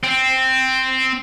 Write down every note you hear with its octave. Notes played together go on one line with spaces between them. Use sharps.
C4